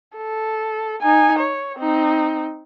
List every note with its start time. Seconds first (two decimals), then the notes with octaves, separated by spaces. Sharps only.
0.17 A4
1.02 D#4 G#5
1.39 C#5
1.78 C4 D#4